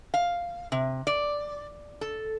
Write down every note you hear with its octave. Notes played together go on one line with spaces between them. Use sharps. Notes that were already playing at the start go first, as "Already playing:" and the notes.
F5
C3
D5
A4